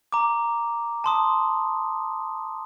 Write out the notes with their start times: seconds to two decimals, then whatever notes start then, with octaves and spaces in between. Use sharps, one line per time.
0.12 A#5 D6
1.04 A5 C6 D#6